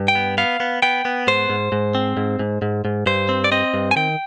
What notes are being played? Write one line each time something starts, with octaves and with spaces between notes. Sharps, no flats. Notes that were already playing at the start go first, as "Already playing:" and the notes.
Already playing: G2
G5
B3
B3 F5
B3
B3 G5
B3
G#2 C5
G#2
G#2
C4
G#2
G#2
G#2
G#2
G2 C5
C4
D5
C4 D#5
G2
G#5
D#3 G5